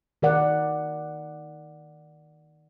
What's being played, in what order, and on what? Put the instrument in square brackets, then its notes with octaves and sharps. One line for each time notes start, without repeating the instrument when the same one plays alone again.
[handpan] D#3 A#4 D5 F#5